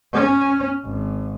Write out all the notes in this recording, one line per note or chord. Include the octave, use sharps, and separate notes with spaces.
C#4
G#1